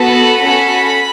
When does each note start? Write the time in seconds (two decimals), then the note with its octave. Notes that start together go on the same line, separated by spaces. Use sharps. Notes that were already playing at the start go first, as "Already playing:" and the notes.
Already playing: B3 F#4 A4 B5
0.40 C#4 F#4 A4